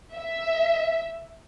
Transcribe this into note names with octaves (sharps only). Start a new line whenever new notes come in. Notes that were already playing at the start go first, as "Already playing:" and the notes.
E5